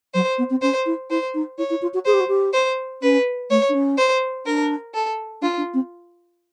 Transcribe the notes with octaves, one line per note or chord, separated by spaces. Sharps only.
F#3 C5
B3
C4
C#4 C5
E4
E4 C5
D#4
E4 C#5
E4
F4
F#4
G#4 C5
G4
F#4
G4
C5
C#4 B4
A3 C#5
D4
C#4
C5
D4 A#4
A4
D4 F4
D4
C4